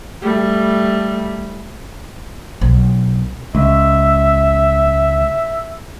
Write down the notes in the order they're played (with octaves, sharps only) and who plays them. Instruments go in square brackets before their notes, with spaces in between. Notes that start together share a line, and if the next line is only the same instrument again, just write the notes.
[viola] G3 A3
[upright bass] B1
[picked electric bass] C#2 [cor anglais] E5